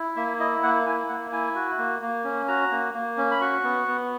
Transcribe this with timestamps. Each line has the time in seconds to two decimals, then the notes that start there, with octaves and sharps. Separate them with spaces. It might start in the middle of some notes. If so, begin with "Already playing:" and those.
Already playing: E4
0.16 A#3 E5
0.39 E4 D#5
0.63 A#3 F#5
0.86 E4 G#5
1.09 A#3 F#5
1.32 E4 G#5
1.55 F#4
1.78 A#3
2.02 A#3
2.24 C#4
2.48 F#4 A#5
2.71 A#3
2.94 A#3
3.17 C#4
3.31 B5
3.41 F#4 C#6
3.64 B3
3.88 B3